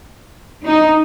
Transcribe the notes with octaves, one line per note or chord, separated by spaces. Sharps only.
D#4